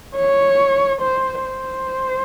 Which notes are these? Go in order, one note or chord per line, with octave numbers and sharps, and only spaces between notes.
C#5
C5
C5